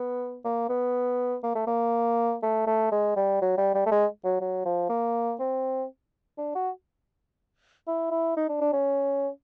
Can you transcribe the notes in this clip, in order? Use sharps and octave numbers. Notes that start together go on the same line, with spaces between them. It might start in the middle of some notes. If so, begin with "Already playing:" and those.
Already playing: B3
A#3
B3
A#3
A3
A#3
A3
A3
G#3
G3
F#3
G3
G3
A3
G#3
F#3
F#3
F3
A#3
C4
D4
F#4
E4
E4
D#4
D4
D4
C#4